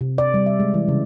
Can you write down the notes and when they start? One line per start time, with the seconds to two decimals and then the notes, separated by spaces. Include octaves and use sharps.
0.01 C3
0.18 D5
0.34 G3
0.46 E5
0.60 G#3
0.74 E3
0.88 C#3